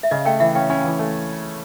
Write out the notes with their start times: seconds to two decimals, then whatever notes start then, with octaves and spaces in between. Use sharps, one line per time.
0.03 E5
0.11 C#3 D#5 F5
0.25 A3 F5 G5
0.40 E3 E5 F#5
0.55 C#4 F5 G5
0.70 C#4 F#5 G#5
0.84 E3
0.99 A3